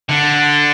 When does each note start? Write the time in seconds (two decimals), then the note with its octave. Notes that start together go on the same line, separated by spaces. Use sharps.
0.09 D3